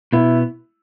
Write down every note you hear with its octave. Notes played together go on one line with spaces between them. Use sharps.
B2 B3 E4